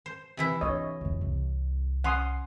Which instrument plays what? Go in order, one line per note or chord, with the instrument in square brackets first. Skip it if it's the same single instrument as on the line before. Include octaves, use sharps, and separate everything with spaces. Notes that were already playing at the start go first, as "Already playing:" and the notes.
[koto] C5
C3 E3 E4
[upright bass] D4 F4 [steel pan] C#5 D#5
[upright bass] F2 D3
C2
[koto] C#4 [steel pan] F#5 C6 D#6